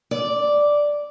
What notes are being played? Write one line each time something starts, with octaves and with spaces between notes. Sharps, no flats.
D5